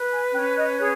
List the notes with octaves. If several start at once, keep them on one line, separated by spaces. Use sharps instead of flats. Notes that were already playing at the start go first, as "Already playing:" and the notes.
Already playing: B4
G#5
C#4 G5
D#5
G#4 C#5